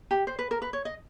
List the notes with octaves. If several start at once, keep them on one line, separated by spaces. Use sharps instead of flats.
G4
C5
B4
A#4
B4
C#5
D#5